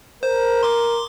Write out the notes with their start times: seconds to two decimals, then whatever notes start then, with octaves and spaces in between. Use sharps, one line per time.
0.23 A#4 C5
0.63 C6 D6